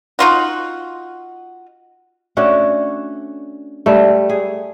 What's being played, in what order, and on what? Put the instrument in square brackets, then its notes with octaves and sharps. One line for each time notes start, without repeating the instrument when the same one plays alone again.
[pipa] D#4 F4 F#4
[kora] A3 C#4 D4 F#4
G3 A3
G#4